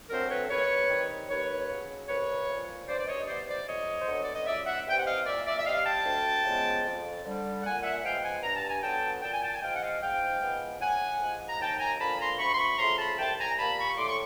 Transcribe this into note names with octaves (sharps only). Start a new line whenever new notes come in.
D3 F#3 A3 C4 A#4 C5
B4 C#5
D#2 B4 C#5
D#3 G3 C4
D#2 B4 C#5
C#3 F#3
C2 B4 C#5
A#2 F3
G2 C5 D5
D5
C#5 D#5
E3 G3 B3 C5 D5
C5 D5
F2 C#5 D#5
C5
D3 F#3 B3 C#5
D5
D#5
C#2 D5 E5
E5 F#5
C3 E3 G3 C4 G5
F#5
D#5 F5
A#2 D5 E5
D5 E5
E5
G3 C4 D#5 F5
G5 A5
D2
C#3 F3 G#3 B3
F2
D3 G3
A#2 F#5 G#5
E5 F#5
F3 G#3 B3 F5 G5
F#5 G#5
G2 A#5
A5
G#5
D3 F#3 B3 G5 A5
A#2 G5 A5
G#5
G5 A5
G#5
F3 G#3 F5 G5
F#5
D#5 F5
G#2 F5 G5
F3 G#3 B3
A2 F#5 G#5
F3 G#3
A#5
D#2 G5 A5
G#5 A#5
D3 F3 A#3 A5 B5
A#5 C6
D2 B5 C#6
C6
B5 C#6
C#3 F3 A3 A#5 C6
A5 B5
C2 G5 A5
G#5 A#5
A#2 G3 A#3 A5 B5
B5 C#6
C#6
A2 C6 D6
C#6